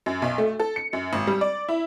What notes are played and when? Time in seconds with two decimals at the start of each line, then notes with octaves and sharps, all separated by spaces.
0.06 F#2
0.22 B1
0.38 A3
0.60 A4
0.76 C#7
0.93 F#2
1.13 G#1
1.27 G3
1.41 D5
1.68 E4